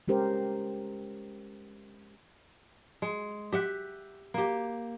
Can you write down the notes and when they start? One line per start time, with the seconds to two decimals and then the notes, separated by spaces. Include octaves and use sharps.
0.08 G#3 C#4 G4 A#4 C5
3.02 G#3
3.52 G4 E5 F#5
4.34 A#3 G4